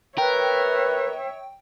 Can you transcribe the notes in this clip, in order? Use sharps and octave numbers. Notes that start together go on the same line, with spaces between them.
A#4 B4 C#5 E5 G5